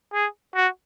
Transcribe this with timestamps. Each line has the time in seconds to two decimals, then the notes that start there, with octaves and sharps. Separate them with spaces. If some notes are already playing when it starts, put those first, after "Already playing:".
0.13 G#4
0.55 F#4